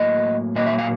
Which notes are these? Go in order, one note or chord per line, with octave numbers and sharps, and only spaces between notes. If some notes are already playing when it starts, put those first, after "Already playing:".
Already playing: A2 F#3 A#3 D#5
A#2 F#3 A#3 D#5
E5
F5